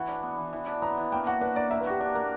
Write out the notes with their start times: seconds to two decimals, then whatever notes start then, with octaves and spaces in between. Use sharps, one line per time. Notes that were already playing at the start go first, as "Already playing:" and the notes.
Already playing: E3 F#4 F#5
0.08 D4
0.23 B3
0.38 E3
0.53 E3
0.67 D4
0.82 B3 A#5
0.97 E3
1.12 A#3 G5
1.27 F#4 F#5
1.41 D4 B4
1.56 A#3 D5
1.71 A#3 E5
1.81 B4
1.86 F#4 G4
2.00 D4 G4
2.15 A#3 A#4